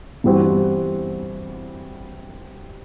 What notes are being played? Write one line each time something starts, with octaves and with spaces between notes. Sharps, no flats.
G2 E3 G3 C4 F#4